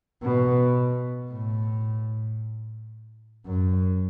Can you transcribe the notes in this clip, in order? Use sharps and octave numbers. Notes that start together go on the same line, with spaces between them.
B2
A2
F#2